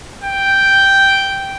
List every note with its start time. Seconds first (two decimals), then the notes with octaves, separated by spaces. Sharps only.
0.24 G5